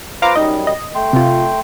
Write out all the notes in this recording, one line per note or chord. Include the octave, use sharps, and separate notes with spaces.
F4 B4 C5 F5 A#5 D6
F#2 G3 D#4 D#5
D#5
A3 G5 C6
C3 F4